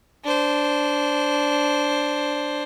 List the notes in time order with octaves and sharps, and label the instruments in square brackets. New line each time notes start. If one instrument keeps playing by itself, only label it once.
[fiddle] D4 C5